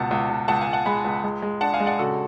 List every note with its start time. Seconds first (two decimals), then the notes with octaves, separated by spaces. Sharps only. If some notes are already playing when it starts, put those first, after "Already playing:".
Already playing: C#2 B2 F#5 A5
0.11 C#2
0.29 C#2
0.48 C#2 F#5 A5
0.61 F5 G#5
0.68 C#2
0.73 F#5 A5
0.86 G#3 G#5 B5
1.05 C#2
1.24 G#3
1.42 G#3
1.61 D4 F#5 A5
1.73 F5 G#5
1.80 G#3
1.86 D5 F#5
1.99 C#3 F#4 A4